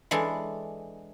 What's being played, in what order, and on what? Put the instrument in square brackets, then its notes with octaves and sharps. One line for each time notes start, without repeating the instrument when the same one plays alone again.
[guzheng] E3 G#3 D4 A4